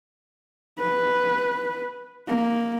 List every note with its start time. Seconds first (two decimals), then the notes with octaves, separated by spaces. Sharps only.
0.80 B4
2.28 A#3